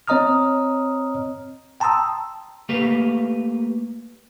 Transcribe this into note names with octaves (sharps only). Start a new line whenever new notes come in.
C4 C#5 D#5 A#5 D#6 F6
G5 A5 A#5 C6 D#6 E6
A3 A#3 G4 B4